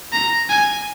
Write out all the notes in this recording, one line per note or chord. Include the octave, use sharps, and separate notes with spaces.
A#5
G#5